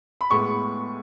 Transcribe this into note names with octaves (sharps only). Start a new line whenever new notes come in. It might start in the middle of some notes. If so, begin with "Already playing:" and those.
B5
A2 G#3 B3 C#6